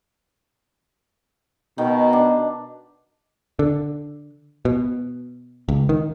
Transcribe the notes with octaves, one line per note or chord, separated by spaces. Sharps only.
B2 D#3
D4
D3
B2
C#2
D#3